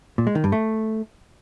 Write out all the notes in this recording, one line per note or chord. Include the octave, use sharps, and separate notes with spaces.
A#2
G#3
D#3
G2
A3